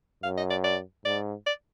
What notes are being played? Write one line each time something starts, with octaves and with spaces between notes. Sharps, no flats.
F#2 F5
D#5
D5
D5
G#2 D5
D5